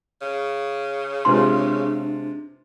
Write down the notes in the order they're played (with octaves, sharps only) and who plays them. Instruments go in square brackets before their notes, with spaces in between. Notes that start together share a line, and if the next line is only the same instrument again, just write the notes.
[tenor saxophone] C#3
[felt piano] C3 G#3 F4 [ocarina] D4 [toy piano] B4 C5 C6